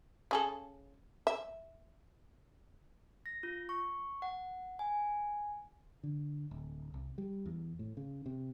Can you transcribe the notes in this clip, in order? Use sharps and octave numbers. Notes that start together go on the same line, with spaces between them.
C#3 G#4 A4
E5
A#6
F4
C#6
F#5
G#5
D3
D1
C2
G3
E2
A2
C#3
C3